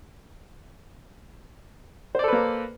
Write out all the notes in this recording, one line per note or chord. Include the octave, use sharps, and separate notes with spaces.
A#3 A4 B4 C5 D5